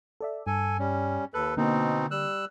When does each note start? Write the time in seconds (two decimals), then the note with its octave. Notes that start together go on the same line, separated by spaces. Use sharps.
0.21 A4 D5 E5
0.47 G2 A4 G#5
0.79 G3 C#4
1.34 D#2 A4 B4 F#6
1.57 B2 D3 A#3 C4 D#4
2.11 G3 E6 F#6